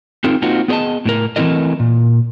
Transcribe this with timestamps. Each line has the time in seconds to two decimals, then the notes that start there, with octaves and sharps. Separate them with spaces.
0.24 C4 D#4 F4 G#4 A#4
0.42 A#3 C4 D#4 F4 F#4
0.68 B3 G#4 C5 D5 D#5 A5
1.05 A2 E4 A#4
1.36 E3 A3 C4 E4 A#4 D#5
1.80 A#2